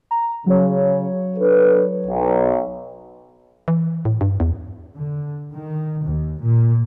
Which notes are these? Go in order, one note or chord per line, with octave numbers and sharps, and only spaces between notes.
A#5
C#3 F#3 C#5
D4 A4 B4
B1
E3
A2
G2
E2
D3
D#3
D#2
A#2